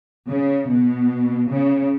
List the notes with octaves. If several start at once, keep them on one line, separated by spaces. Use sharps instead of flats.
C#3
B2
C#3